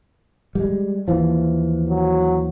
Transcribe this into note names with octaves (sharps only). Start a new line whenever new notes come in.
G3 G#3
D#2 E3 F3
F#3